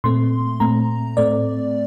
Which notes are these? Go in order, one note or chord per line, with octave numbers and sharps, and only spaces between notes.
A#2 A3 C4 C6
A#2 A3 C4 A#5
A2 A3 C4 D5